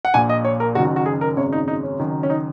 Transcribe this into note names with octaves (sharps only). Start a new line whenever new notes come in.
F#5
A#1 A#2 G#5
D#5
C#5
A#4
F#1 F#2 D#3 F#4
F#4
F#4
G#4
A#4
G#1 F#2 C#3 C#5
D#4
D#4
C#4
F#1 F#2 D#3
C#4
D#4